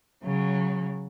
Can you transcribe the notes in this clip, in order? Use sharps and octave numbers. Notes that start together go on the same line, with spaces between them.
C#3 F#3